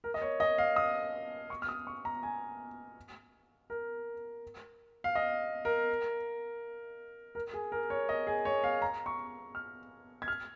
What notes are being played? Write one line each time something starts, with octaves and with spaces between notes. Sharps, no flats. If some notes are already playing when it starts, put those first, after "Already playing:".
A#4
D#5
C#5
D#5
F5
D#6
C#6
F6
D#6
C#6
A#5
G#5
A#4
F5
D#5
A#4
A#4
G#4
A#4
C#5
D#5
G#4
C#5
F5
A#5
C#6
F6
G#6
F6